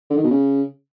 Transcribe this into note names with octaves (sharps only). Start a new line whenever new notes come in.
D3
D#3
B2
C#3